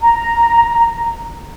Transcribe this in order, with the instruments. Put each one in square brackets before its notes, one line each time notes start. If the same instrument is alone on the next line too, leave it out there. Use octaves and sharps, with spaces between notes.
[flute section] A#5